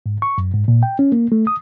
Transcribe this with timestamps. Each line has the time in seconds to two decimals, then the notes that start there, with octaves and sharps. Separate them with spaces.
0.06 G#2
0.22 C#6
0.38 F#2
0.53 G#2
0.68 A#2
0.83 G5
0.99 C#4
1.12 A#3
1.32 A3
1.47 D#6